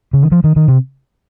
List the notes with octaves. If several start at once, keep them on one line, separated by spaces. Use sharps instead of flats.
C#3
D#3
F3
D#3
D#3
C3